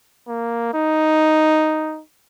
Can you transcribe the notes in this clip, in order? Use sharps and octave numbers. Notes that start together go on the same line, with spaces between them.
A#3
D#4